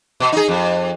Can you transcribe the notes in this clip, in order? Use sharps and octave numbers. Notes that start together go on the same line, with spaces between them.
B2
D#4 G#4
F2